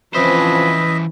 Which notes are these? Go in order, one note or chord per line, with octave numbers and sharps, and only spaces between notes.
E3 F3 C4 C#4 B4 C5 D#5 E5